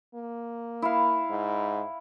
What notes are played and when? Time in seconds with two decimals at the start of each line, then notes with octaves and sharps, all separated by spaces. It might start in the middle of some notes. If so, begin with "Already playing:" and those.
0.15 A#3
0.82 E4 F5
1.30 G#2